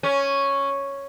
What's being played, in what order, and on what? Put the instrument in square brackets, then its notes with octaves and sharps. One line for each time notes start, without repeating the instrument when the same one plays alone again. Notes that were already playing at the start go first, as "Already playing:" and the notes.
[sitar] C#4